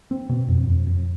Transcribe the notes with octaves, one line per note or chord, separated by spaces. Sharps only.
C4
B2
F2
F2
F2